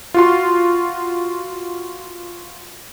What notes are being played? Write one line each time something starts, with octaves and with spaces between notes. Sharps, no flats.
F4 F#4 C6